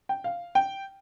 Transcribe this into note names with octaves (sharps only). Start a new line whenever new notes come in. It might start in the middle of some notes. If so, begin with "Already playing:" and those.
G5
F5
G5